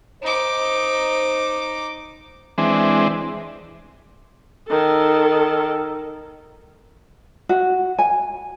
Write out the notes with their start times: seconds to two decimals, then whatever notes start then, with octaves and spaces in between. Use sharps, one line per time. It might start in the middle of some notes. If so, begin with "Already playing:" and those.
0.23 D#4 C5 D6
2.58 E3 G#3 C4 D4
4.69 D#3 A4
7.49 F#4
7.99 G#5